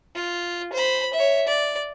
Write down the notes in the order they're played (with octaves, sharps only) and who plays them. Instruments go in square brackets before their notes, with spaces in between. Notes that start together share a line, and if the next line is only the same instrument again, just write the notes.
[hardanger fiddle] F4
C5 B5
C#5 E5
D5